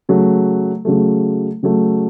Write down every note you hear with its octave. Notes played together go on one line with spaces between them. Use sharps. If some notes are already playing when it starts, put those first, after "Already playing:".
C#3 F#3 A3
C#3 F#3 A3
C#3 F#3 A3